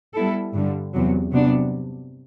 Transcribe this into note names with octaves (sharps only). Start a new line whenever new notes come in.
G3 B3 E4 A4
G2 D3 G3
E2 C3 F#3
C3 F#3 B3 D4